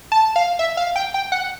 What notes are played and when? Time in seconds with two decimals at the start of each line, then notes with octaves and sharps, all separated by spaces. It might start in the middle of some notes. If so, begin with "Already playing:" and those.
0.12 A5
0.36 F5
0.59 E5
0.77 F5
0.96 G5
1.14 G5
1.32 F#5